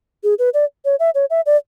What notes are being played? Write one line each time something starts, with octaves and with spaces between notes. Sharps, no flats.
G#4
B4
D5
C#5
E5
C#5
E5
D5